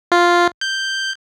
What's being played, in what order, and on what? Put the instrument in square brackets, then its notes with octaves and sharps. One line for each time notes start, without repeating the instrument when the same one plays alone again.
[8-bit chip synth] F4
G6